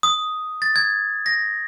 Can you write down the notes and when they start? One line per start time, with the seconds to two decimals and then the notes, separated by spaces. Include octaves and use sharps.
0.03 D#6
0.62 A6
0.76 G#6
1.26 A#6